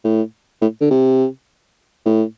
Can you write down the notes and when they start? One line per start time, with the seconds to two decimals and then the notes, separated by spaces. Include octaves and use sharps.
0.04 A2
0.61 A2
0.81 D3
0.90 C3
2.06 A2